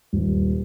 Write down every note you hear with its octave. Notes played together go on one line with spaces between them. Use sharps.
D#1